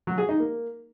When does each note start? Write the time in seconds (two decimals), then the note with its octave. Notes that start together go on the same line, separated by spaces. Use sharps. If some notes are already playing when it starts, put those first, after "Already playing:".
0.07 F#3
0.18 G#4
0.29 D#4
0.40 A#3